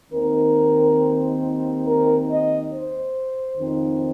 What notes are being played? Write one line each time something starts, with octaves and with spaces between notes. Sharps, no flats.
D#2 D#3 C4 D#4 A#4
A#4
D#5
C5
F2 D#3 C4 D#4